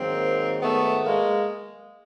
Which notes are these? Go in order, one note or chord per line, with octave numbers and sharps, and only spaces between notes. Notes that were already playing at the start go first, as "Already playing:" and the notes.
Already playing: G#2 D#3 F#3 A#3 C4
A3 B3
G#3 A#3